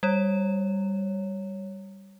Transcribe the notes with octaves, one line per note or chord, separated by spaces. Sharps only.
G3 C#5